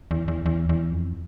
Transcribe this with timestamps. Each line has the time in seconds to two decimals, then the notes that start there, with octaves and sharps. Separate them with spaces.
0.11 E2
0.28 E2
0.46 E2
0.69 E2
0.92 F2